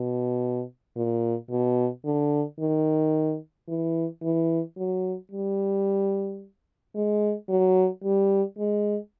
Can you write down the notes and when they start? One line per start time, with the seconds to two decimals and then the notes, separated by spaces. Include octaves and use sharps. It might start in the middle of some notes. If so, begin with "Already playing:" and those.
Already playing: B2
0.96 A#2
1.50 B2
2.05 D3
2.60 D#3
3.68 E3
4.22 E3
4.78 F#3
5.31 G3
6.95 G#3
7.49 F#3
8.04 G3
8.59 G#3